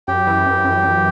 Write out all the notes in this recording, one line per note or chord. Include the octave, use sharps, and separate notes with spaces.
F#2 G4 G5
E3
F#2
F#2
F#2